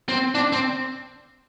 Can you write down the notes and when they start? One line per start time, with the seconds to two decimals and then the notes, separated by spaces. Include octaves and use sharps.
0.09 C4
0.35 D4
0.53 C4